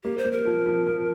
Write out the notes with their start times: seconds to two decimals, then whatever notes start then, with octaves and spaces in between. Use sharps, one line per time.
0.04 A#3 G4
0.18 C5
0.25 A#3
0.32 A#4
0.45 F3
0.66 F3
0.87 F3